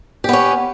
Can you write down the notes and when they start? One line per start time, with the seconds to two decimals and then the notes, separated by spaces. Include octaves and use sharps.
0.24 G4
0.29 B3
0.33 C#4